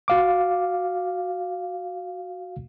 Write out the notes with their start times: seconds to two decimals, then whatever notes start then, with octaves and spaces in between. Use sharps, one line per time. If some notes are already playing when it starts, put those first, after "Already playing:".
0.08 F#4 F5 D6